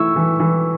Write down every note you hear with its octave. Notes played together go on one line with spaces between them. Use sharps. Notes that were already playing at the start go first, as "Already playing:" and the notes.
Already playing: E3 A3 E4 C#6 E6
E3
E3